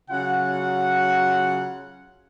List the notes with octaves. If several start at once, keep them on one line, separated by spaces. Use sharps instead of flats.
C#3 F#3 F4 F#5